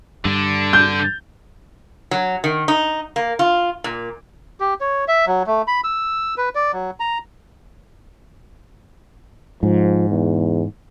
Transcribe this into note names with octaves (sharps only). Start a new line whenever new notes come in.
G2 D3 D4
G6
F#3
D#3
D#4
A#3
F4
A#2
G4
C#5
E5
F#3
A3
B5
E6
B4
D5
F#3
A#5
G#2 F3
E2